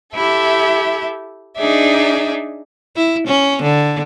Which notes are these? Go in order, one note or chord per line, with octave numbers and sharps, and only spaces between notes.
E4 G4 A4 E5
D4 D#4 G#4 D5 E5
E4
C#4
D3